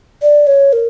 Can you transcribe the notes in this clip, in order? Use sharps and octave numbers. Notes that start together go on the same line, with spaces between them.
D5
C#5
A#4